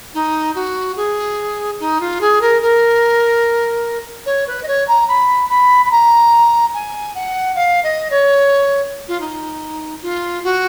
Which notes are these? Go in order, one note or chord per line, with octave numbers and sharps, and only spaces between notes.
D#4
F#4
G#4
D#4
F4
G#4
A#4
A#4
C#5
B4
D#5
C#5
A#5
B5
B5
B5
A#5
G#5
F#5
F5
D#5
C#5
F4
D#4
F4
F#4